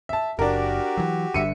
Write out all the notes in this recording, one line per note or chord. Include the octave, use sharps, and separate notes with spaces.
E5 A5
F#1 D4 F#4 G4 A#4
E3 F#3
G1 G2 D3 E5 C#7 D#7